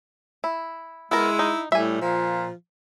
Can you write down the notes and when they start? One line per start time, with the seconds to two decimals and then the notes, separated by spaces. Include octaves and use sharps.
0.44 E4
1.11 G#3 B3 E4 A#4
1.39 D#4
1.72 A2 G3 E5 G#5
2.01 A#2 F3